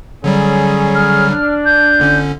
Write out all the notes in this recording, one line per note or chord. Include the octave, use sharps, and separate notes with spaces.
D3 F#3 G3 C#4 G#4
F6
D4
G6
G1 D3 C#4